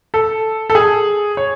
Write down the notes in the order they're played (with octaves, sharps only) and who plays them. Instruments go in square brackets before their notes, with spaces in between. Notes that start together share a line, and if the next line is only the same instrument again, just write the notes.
[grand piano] A4
A4
G#4
C#5